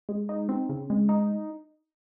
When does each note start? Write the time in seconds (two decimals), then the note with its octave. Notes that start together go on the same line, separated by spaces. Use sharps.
0.09 G#3
0.29 D#4
0.49 C4
0.69 C#3
0.90 G#3
1.09 D#4